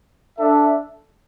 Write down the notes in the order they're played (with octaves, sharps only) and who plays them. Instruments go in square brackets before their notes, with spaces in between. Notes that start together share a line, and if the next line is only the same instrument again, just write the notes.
[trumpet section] D4 A4 E5